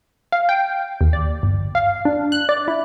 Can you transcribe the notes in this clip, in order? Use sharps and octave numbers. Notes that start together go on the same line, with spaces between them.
F5
G5
D#2
D5
G1
F5
D4
F#6
D5
E4